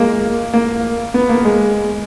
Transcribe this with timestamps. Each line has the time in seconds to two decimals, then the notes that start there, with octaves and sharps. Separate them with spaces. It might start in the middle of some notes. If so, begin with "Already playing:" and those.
Already playing: G#3 A#3
0.54 A#3
1.14 B3
1.29 A#3
1.45 G#3